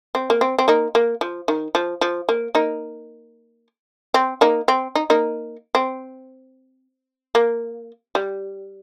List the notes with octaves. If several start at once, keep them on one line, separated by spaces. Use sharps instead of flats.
C4
A#3
C4
C4
A#3 D#4
A#3
F3
D#3
F3
F3
A#3
A#3 D#4
C4
A#3 D#4
C4
D#4
A#3 D#4
C4
A#3
G3